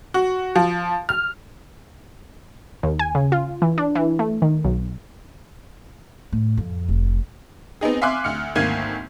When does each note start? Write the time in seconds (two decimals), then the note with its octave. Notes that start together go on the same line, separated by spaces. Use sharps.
0.14 F#4
0.56 F3
1.09 F6
2.83 D#2
2.99 G#5
3.15 C#3
3.32 F4
3.62 E3
3.78 D4
3.95 E3
4.19 A3
4.42 D#3
4.65 B1
6.33 A2
6.57 F2
6.88 F1
7.81 B3 C4 D#4 G#4
8.02 E5 F5 G#5 C6 D6 F#6
8.24 D2 F6 C#7
8.56 G#1 D2 D#3 A#3 G#6 D#7